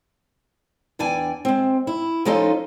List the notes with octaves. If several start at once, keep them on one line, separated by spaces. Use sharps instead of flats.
E2 D4 D5 G5 G#5
G#3 C4
E4
F3 C#4 D#4 F4 A4 D#5